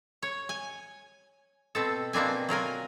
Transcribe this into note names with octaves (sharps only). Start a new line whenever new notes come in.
C#5
G#5
B2 C4 A4
B2 A#3 C4 D4 G#5
F#3 F4 A#4 G#5